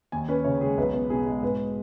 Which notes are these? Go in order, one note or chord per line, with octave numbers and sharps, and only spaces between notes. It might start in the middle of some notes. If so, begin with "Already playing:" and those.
D#2 G#5
C#4 B4
C#3 C#5
G#3 G#4
B1 B4
B3
B2 G#4
G#3
G#2 B4